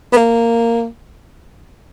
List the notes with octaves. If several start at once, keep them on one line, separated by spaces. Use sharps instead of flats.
B3
A#3